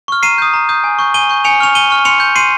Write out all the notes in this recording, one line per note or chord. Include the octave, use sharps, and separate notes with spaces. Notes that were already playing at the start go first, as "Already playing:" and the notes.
C#6 F6
A#5 C7 D#7
D#6 G6
A#5
D#6 G6
G#5
C#6 G6
G#5 D#7 G7
C#6 G6
G#5 C#7 F7
C#6 F6 F7
G#5 D#7 G7
C#6 F6
C6 C#7 F7
G6
C6 C7 D#7